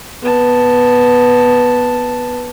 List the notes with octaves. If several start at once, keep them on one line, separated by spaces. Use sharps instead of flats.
B3 A5